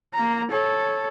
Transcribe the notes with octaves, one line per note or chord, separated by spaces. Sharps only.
A#3 A#5
A4 C#5